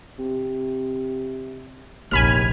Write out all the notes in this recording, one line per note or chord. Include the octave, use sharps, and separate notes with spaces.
C3
F1 A#1 D#2 G#5 B5 F6